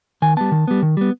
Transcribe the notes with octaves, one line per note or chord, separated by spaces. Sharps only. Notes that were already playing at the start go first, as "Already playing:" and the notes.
D#3 G#5
G3 B3 A5
D#3
G3 B3
D#3
G3 B3